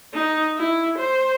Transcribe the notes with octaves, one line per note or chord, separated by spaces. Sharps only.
D#4
E4
C5